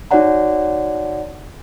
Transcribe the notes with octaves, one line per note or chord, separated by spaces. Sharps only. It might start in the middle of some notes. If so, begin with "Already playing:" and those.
D#4 F#4 C#5 D5 F#5 A#5